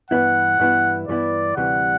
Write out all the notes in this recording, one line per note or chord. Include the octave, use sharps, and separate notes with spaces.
G2 E3 B3 E4 F#5
G2 E3 B3 E4
G2 E3 B3 E4 D5
D2 C3 E3 G3 F#5